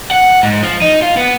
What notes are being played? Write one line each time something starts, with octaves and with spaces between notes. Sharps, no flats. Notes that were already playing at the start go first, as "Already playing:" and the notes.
F#5
G#2
F3
D#4
F4
B3